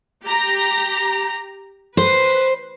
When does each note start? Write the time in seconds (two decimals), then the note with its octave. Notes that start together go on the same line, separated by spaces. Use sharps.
0.24 G4 A#5
1.97 B4 C5